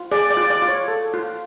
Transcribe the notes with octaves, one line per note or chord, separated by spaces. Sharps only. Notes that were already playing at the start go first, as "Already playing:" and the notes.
Already playing: F4
G#4 D5
D5
F4
D5
F4
C#5
A4
F4